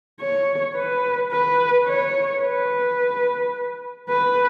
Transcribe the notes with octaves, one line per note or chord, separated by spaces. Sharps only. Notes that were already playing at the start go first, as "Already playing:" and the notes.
C#5
B4
B4
C#5
B4
B4